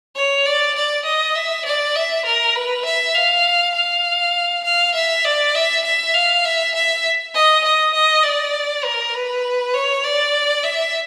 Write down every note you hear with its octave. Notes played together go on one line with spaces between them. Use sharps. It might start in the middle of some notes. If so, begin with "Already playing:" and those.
C#5
D5
D5
D#5
E5
D5
E5
A#4
B4
E5
F5
F5
F5
E5
D5
E5
E5
F5
E5
E5
D#5
D#5
D#5
D5
A#4
B4
C#5
D5
E5